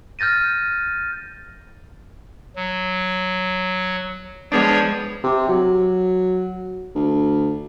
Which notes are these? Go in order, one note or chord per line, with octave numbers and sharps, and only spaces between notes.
F6 G6 A6 A#6 D#7
F#3
F3 G#3 B3 D4 G#4 C#5
C3
F#3
D2